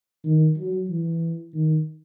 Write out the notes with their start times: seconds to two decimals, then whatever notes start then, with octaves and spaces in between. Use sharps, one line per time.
0.24 D#3
0.57 F#3
0.89 E3
1.54 D#3